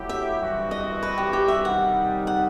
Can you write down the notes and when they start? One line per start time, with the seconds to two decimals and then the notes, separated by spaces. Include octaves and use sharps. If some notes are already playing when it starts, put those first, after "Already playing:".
Already playing: F#3 A3 E4 G4
0.09 E5
0.40 G2 E3 G3 C4 F#4
0.71 D#5
1.03 B4
1.18 G4
1.33 G4
1.48 E5
1.64 C3 D#3 G3 D#4 F#5
2.27 F#5